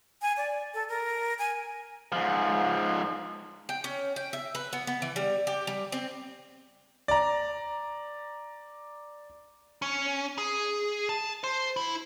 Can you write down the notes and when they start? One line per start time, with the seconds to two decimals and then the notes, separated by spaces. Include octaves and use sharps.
0.22 G#5
0.37 D5
0.74 A4
0.89 A#4
1.39 G#5
2.12 G#2 F3
3.69 G5
3.84 C#4
4.16 G5
4.33 E5
4.55 B4
4.73 B3
4.87 B3
5.02 E3
5.16 G3
5.47 G4
5.67 G3
5.92 C4
7.08 D5 A#5
9.82 C#4
10.38 G#4
11.09 A5
11.44 C5
11.76 E4